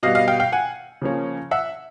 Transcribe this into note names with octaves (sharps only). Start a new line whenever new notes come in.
B2 G3 B3 D#5 F5
D#5 F5
F5 G5
F5 G5
F#5 G#5
C#3 F3 A#3 C#4
E5 F#5